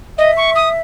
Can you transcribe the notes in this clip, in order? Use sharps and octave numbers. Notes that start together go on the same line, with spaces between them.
D#5 E5
C#6
D#6